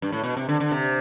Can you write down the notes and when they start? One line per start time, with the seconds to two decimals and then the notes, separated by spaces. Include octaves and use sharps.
0.02 G2
0.12 A2
0.23 B2
0.37 C3
0.49 D3
0.60 D3
0.71 C3